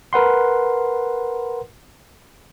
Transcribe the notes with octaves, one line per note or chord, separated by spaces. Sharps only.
A#4 B4 F#5 C6